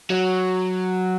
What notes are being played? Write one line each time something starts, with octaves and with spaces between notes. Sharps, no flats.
F#3